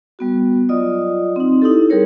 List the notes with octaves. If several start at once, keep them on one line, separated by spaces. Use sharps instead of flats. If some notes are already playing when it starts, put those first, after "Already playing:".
G3 B3 F#4
F#3 F4 D5 D#5 D#6
C4 D#4
D#4 E4 G4 A4
G3 G4 G#4 A#4 C#5